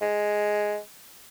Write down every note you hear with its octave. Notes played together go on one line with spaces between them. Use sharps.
G#3